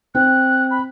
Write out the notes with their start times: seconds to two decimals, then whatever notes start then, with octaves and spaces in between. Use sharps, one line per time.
0.15 C4 F#6
0.71 B5